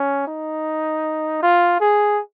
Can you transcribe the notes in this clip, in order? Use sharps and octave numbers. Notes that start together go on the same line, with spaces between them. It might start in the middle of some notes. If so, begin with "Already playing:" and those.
Already playing: C#4
D#4
F4
G#4